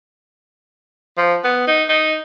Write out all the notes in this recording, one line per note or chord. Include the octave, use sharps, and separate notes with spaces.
F3
B3
D#4
D#4